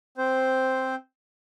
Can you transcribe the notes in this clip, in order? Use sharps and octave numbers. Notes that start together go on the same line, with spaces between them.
C4 C5